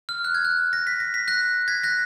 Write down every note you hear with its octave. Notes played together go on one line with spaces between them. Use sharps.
F6
F#6
G#6
F#6
A#6
B6
A#6
B6
F#6 A#6
G#6 B6
F#6 A#6